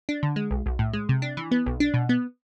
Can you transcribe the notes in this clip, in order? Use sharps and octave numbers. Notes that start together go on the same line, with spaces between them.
D4
D3
G#3
B1
B1
A2
G#3
C3
D4
E3
B3
B1
D4
B2
B3